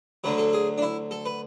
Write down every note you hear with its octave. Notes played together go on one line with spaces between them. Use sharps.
D2 D3 F#3 B4
A4
G#4
D4
E4
A4
B4